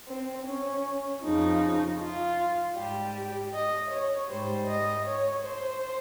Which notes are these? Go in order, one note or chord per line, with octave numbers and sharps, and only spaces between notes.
C4
C#4
F2 C#3 F3 D#4
F4
G#2 G3 G4
D#5
C#5
G#2 G3 C5
D#5
C#5
C5